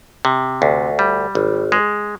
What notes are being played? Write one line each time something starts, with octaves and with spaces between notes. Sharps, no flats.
C3
D2
G3
G#1
G#3